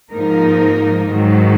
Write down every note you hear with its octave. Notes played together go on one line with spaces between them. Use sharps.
G#2 F3 A#3 D#4 A#4
G#2 D#3 F#3